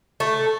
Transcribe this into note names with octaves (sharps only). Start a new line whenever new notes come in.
A3